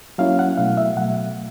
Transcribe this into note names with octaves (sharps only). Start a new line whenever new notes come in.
F#3 A#3 C#4 E4 F5
F#5
B2 F#3 A3 F5
E5
B2 F#3 A3 F#5